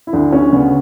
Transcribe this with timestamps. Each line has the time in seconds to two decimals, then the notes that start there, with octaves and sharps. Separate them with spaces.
0.07 E4
0.13 D2 D4
0.32 D2 C#4
0.52 C#3 B3